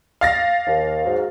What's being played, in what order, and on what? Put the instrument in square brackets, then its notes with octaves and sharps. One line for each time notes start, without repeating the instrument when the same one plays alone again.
[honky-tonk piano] F5 A6 A#6
[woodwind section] D#2
G#2 F#3